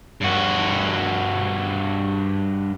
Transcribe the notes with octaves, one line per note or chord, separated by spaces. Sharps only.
G2 F#4